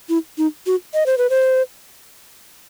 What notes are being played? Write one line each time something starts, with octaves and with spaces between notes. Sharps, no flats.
E4
D#4
F#4
D#5
C5
B4
C5